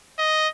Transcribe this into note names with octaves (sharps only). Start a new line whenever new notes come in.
D#5